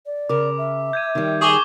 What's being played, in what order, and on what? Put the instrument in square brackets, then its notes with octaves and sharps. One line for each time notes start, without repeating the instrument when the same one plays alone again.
[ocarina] D5
[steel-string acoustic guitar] C#3 A#4 [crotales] D6
[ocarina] E5
[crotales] G6 G#6 D#7
[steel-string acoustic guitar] D#3 G3
[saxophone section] G#4 [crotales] C#6 D6 G7